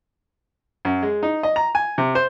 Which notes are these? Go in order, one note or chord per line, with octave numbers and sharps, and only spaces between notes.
F#2
G#3
D#4
D#5
A#5
G#5
C3
C5